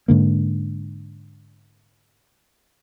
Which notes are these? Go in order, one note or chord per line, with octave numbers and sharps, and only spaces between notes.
G#2 D3 A#3